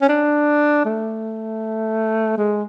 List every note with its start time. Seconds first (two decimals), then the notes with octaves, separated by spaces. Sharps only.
0.02 C#4
0.09 D4
0.85 A3
2.37 G#3